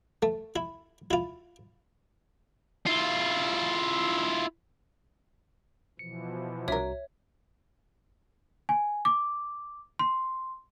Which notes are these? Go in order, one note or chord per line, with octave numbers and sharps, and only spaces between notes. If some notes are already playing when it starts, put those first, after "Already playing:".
A3
E4
E4 F4
E4 F4
B2 E3 F3 C#7
C2 D4 F#4 A#4 C#5 E5
G#5
D6
C6